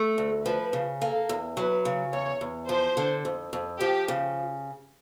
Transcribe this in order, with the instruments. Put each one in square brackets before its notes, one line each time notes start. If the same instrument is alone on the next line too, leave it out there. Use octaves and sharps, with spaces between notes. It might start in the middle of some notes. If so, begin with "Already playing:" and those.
Already playing: [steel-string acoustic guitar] A3
D2
[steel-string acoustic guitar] F3 [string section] B4
[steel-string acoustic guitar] C#3
[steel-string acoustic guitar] A#3 [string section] A4
[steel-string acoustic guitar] E2
[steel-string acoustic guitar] F#3 [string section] B4
[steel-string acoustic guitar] C#3
[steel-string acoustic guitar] E2 [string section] C#5
[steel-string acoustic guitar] E2
[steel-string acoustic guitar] F3 [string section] C5
[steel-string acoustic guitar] D3
F2
F2
[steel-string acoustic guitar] F3 [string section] G4
[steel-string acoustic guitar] C#3